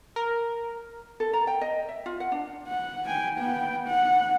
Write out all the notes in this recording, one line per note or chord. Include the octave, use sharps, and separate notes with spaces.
A#4
A4
A#5
G5
D#5
E5
F4
F#5
D4
F#5
G5 G#5
B3 G5
F#5